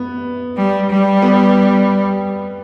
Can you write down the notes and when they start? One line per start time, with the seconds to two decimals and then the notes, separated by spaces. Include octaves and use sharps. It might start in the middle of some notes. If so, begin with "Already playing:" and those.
Already playing: B3
0.56 G3
0.89 G3
1.22 B3